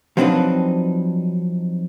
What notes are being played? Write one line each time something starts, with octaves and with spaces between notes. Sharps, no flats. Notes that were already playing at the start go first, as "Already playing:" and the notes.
F3 F#3 C4 D4 D#4 B4